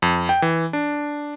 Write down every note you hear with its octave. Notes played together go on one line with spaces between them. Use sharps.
F2
G5
E3
D4